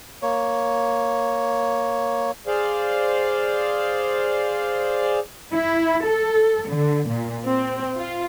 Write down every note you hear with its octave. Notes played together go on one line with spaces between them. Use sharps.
A#3 C#5
G#4 C5 D5 F5
E4
A4
D3
A#2
C4
F4